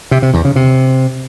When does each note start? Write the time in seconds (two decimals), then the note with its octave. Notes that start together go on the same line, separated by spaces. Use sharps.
0.11 C3
0.22 C3
0.34 E2
0.45 C#3
0.56 C3